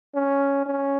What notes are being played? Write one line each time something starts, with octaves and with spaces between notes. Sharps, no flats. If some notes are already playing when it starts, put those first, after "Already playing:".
C#4
C#4